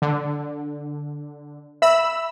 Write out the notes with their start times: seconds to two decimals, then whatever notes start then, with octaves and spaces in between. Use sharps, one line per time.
0.02 D3
1.82 E5 B5 E6